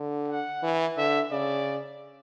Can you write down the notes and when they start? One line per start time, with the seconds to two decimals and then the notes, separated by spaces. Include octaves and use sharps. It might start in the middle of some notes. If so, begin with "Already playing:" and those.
Already playing: D3
0.28 F#5
0.63 E3
0.97 D3 E5
1.31 C#3 D5